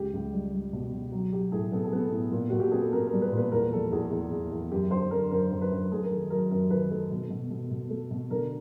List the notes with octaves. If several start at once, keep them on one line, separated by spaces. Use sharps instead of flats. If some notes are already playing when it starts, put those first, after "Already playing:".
Already playing: C#2 G4
C#2
G3
G3
B2
B2
F#3
F#3 G4
A2 G#4
B3 A4
G#4
B3
A4
A2
A#2
A#2 F#4
G4
B3 G#4
A4
B3 A#4
A#4
G3
B4
A#2 B4
E2 A#4
F3 A4
E2 G#4
E2
E2
E2
F#2 G4
D3 C5
D3 A#4
F#2 A#4
F#2
B4
F#2
A3 G#4
A#4
D#3 A4
F#3 A#4
F#2 A#4
D#3 B4
A3 A4
B2
B2
B2
B2
A3
B2
D3 A#4